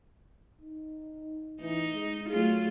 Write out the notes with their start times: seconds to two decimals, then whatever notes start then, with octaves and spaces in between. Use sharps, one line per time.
0.61 D#4
1.61 E3 D#4
1.95 G#3
2.30 F#3 A3 F4 G#4